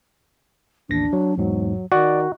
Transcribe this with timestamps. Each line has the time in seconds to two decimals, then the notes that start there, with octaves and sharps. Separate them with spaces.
0.89 A1 D#2 D4 A#6
1.13 F#3
1.38 E2 G#2 F#3
1.92 D#3 F#4 D5